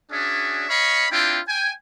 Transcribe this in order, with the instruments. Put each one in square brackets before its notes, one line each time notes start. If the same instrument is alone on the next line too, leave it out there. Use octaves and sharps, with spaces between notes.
[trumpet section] C#4 D4 F#4 G#4 D5 E5
C#5 D#5 F5 B5 C#6
C4 D4 E4 F4 G5
G5 G#5